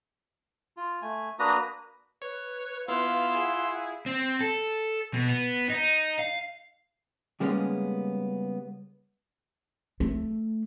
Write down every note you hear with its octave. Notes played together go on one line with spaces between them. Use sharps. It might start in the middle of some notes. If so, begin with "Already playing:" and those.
F4
A3 G#5
A#3 D4 F#4 B4 A#5 D#6
B4 C#5
B3 E4 F4 F5 C6 E6
E4 G#4 F#5
C4
A4
B2
B3
D#4
F5
C#3 G3 G#3 A#3 B3 C#4
A3